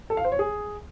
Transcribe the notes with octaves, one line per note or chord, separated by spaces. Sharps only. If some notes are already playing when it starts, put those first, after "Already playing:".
A4
F5
C5
C#5
G#4